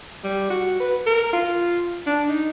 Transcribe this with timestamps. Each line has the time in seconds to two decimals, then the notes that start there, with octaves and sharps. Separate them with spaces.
0.24 G3
0.50 F#4
0.80 B4
1.06 A#4
1.33 F4
2.06 D4
2.29 D#4